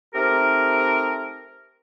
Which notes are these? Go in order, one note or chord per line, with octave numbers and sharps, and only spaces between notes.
A3 C4 D#4 G4 A#4